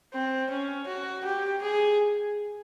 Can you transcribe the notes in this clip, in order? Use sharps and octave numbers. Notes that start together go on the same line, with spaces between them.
C4
C#4
F#4
G4
G#4